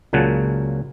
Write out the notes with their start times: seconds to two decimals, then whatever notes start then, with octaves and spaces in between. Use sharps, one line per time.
0.13 C#2 A#2 C#3 F#3 F#5 A5